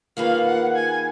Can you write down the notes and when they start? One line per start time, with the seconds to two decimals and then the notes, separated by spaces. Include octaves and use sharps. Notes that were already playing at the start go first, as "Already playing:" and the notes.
0.17 D#3 A#3 F4 G#4 B4 F5
0.46 F#5
0.75 G#5